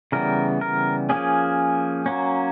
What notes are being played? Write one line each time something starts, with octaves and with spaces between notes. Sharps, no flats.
C#3 E3 G3 B3 A#4
A#4
F3 A#3 C#4 G#4
F#3 A#3 C#4